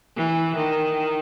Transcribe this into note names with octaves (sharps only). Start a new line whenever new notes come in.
E3
D#3